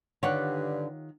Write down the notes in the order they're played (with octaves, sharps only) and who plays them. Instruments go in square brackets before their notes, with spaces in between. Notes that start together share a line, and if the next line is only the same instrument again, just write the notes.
[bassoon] G2 [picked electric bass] D3 [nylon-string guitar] D#3 F4 G4 [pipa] C#5 F#5